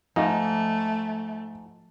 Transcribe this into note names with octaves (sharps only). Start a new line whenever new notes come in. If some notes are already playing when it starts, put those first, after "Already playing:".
G#2 F3 A3 D#4 E5 F5